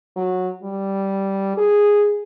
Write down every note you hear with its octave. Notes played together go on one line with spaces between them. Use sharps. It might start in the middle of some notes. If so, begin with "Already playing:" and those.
F#3
G3
G#4